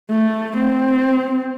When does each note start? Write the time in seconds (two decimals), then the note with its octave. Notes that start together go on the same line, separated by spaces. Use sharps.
0.10 A3
0.57 C4